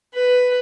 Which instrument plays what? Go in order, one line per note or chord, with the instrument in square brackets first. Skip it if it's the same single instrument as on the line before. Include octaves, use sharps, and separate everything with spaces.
[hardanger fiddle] B4